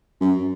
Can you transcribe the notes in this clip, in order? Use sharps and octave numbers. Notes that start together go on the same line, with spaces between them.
F#2